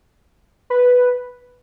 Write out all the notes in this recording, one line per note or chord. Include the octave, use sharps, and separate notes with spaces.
B4